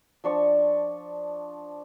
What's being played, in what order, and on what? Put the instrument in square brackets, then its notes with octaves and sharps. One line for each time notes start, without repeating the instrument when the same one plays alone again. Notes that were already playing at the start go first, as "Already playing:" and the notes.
[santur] F3 D4 C#6